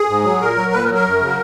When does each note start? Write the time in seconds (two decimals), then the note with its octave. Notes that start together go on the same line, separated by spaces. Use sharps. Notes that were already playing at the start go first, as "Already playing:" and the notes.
Already playing: G#4
0.09 G#2
0.24 F#3
0.40 A#2 A#4
0.57 F#3
0.73 A#2 B4
0.84 A#4
0.89 F#3
0.95 A#4
1.05 F#2
1.21 C#3 F#3